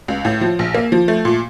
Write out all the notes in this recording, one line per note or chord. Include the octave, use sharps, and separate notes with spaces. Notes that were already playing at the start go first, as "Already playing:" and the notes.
C#2
A2
F3
A#1
A#3
F3
A3
A#2